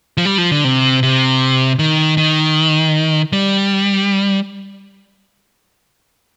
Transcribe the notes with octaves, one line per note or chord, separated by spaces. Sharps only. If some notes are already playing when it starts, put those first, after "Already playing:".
F3
G3
F3
D3
C3
C3
D#3
D#3
G3